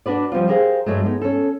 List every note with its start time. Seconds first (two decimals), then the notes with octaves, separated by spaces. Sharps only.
0.06 D4 F#4 B4 D5
0.32 F3 G3 C4 F4
0.48 G4 G#4 A#4 C5 D#5 F5
0.86 G2 F#3 G#3 A3
1.04 G#3 B3 D#4
1.22 C#4 A4